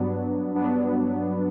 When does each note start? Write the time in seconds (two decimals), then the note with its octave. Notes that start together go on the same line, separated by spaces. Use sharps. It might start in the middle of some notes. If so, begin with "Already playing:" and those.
Already playing: G2 F#3 B3 D4
0.55 G2 F#3 B3 D4